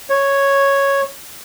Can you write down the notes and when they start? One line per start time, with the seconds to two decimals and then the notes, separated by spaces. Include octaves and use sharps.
0.10 C#5